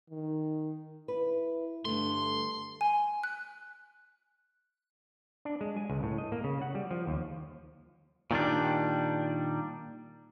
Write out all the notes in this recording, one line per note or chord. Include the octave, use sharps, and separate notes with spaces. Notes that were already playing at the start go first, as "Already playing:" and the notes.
D#3
E4 B4
G2 D3 A3 C6
G#5
F#6
D4
G#3
G#5
C#2
A2
D#5
A#3
C#3
F#5
G3
F3
D#2
A#2 D#3 G3 D4